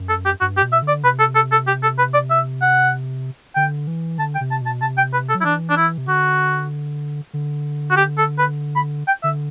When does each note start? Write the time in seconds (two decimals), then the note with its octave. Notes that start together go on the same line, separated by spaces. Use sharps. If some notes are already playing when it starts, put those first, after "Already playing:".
Already playing: F#2
0.09 A4
0.26 G4
0.41 G2 F#4
0.57 G4
0.62 B2
0.73 E5
0.82 D3
0.88 D5
1.04 C3 B4
1.19 A4
1.35 A4
1.52 A4
1.67 G4
1.83 A4
1.98 B4
2.14 D5
2.30 E5
2.62 F#5
3.56 D3 G5
3.87 E3
4.18 D3 A5
4.35 G5
4.40 C3
4.51 A5
4.61 B2 A5
4.81 C3 A5
4.98 G5
5.13 B4
5.29 A4
5.35 F#3
5.41 E4
5.44 E3 D4
5.70 D4
5.77 E4
5.98 C3
6.07 D3 F#4
7.33 D3
7.91 F#4
7.97 G4
8.18 A4
8.39 B4
8.76 B5
9.08 G5
9.23 D3 E5